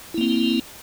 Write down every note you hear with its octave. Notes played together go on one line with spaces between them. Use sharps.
A#3 C4 E4